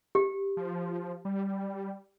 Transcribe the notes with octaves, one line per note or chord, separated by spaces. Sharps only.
G4
F3
G3